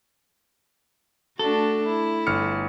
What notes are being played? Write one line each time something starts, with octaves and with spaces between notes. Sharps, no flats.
A3 D4 F#4 A4
E4
G1 F6 C#7